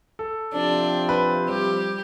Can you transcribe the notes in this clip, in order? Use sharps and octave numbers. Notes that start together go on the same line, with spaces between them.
A4
C3 F3 C4 D4
B4
G3 G4